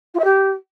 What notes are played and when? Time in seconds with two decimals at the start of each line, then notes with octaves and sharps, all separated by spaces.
0.14 F4
0.19 E5
0.24 G4